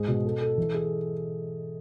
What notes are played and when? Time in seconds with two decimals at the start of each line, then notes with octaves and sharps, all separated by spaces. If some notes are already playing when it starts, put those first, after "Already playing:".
Already playing: G#2 G#4
0.08 B2
0.25 A4
0.41 A4
0.58 E3
0.74 G#4